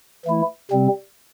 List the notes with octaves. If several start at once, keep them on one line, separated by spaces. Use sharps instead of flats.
E3 A3 E4
C3 G3 C4